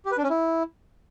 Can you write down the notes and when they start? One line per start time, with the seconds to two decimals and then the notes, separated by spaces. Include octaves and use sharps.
0.05 G4
0.12 B4
0.18 D4
0.24 C#4
0.30 E4